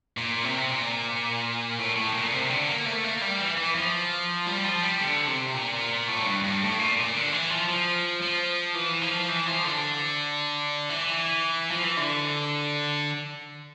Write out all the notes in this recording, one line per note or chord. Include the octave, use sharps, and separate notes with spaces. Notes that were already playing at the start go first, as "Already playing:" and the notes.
A#2
C3
A#2
A2
A2
A#2
C3
D3
A#3
A3
A#3
G3
E3
E3
F3
G3
F3
G3
D3
C3
A#2
A2
G2
G2
A2
A#2
A#2
D3
E3
F3
F3
F3
E3
F3
E3
F3
D3
E3
F3
E3
D3